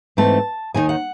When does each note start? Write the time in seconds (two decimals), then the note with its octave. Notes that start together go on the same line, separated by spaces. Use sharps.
0.17 G#2 E3 A3 C4 D#4 A5
0.74 D#2 D#3 G#3 D#4 G#5
0.89 F#5